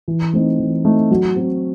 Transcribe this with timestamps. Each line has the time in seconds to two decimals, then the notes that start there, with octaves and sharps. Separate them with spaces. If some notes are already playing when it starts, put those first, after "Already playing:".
0.08 E3
0.33 A3 C4 D#4
0.60 E3
0.85 A3 C4 D#4
1.11 F#3
1.36 C4 F#4